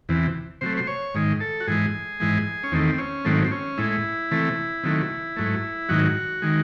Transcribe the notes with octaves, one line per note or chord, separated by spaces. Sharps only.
E2 C3 E3
C3 F#3 A3 C5
C5
C#5
G#2 D#3 G#3
A4
F#4
G#2 E3 G#3 G#4
G#2 E3 G#3
C#4
E2 D#3 A3 C4
C#4
G#2 D#3 F#3 A3 C4
C4
C#4
A2 G#3 E4
C3 E3 A3
C3 D#3 F#3 A3
G#2 F#3 A3
G#2 D#3 F#3 F#4
D#3 G#3